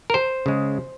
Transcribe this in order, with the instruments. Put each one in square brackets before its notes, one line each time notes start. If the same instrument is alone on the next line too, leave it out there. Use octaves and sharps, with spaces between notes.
[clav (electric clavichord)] A#4
C5
C#3 G#3